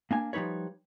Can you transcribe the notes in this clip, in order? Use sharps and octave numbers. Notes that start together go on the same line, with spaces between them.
A#3 D4 G#5
F3 G3 D#4 B4 C#5